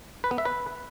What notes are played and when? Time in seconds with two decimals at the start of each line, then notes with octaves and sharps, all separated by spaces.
0.24 B4
0.31 B3
0.38 E5
0.45 B4